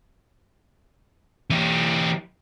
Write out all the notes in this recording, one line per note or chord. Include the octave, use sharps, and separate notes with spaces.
E3 G4